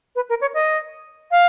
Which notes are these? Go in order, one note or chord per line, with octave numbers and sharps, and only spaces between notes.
B4
A#4
C#5
D#5
F5